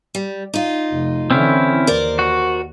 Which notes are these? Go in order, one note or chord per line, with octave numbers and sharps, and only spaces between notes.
G3
D#4 F4
F1
D3 E3 C4 C#4 E4
D#2 A#4 C5 D5
F#4